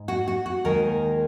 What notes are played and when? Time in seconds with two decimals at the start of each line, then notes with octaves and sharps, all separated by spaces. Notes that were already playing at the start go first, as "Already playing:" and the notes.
Already playing: G#2
0.08 F#4
0.28 F#4
0.46 F#4
0.64 D#2 D#3 G#3 A#4